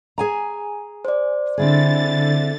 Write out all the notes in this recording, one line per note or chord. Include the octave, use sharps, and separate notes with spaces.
G#4 G#5 A#5
C5 D5
D3 C4 E4 G#4 A6